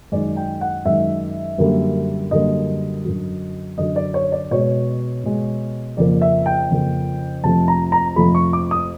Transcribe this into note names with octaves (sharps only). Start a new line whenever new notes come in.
F#2 D#3 G#3 D5
G5
F#5
F#2 D#3 G#3 E5
F#2 D3 G3 A#3
F#2 D3 G3 A#3 D#5
F#2 D3 F#3
F#2 D3 F#3 D#5
D5
C#5
D5
B2 G#3 C#5
B2 G#3
F2 C#3 F3 A#3 D5
E5
G5
F2 C#3 F3 A#3
F2 C3 F3 A3 A5
A#5
A#5
F2 C3 F3 A3 B5
C#6
D6
D#6